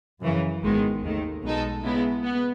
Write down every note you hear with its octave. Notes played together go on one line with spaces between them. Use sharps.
F#2 C#3 E3
G#1 G#2 D#3 G#3 B3
D#2 D#3 A3
B1 B2 G#3 D#4 A4
C#3 G#3 B3 E4
B3